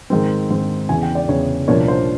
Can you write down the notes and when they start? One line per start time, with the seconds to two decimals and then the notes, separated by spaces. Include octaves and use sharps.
0.10 G#2 D#3 G#3 C4
0.51 G#2 D#3 G#3 C4
0.89 E2 C#3 E3 G#5
1.03 G5
1.15 D5
1.28 E2 C#3 E3 C#5
1.67 C2 A#2 F3 A#3 D4 C#5
1.88 C5